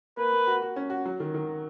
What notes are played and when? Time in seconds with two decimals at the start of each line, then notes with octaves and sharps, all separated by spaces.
0.17 A#3 B4
0.32 A#3
0.47 F#4
0.62 F#4
0.76 C#4
0.90 F#4
1.05 F#3
1.20 D#3
1.34 D#3